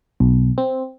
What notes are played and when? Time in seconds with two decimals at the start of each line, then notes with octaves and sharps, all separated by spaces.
0.20 B1
0.58 C4